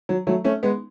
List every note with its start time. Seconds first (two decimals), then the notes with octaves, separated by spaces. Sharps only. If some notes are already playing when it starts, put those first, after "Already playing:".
0.09 F#3
0.27 F#3 A3
0.44 A3 C#4
0.63 G#3 B3